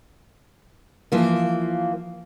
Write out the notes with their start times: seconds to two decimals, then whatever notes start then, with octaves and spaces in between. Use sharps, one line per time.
1.12 E3 F3 A#3